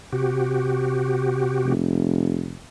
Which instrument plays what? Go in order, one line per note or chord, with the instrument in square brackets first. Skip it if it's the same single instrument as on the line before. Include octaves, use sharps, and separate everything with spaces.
[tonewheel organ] C3 F#4 G4
[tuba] F1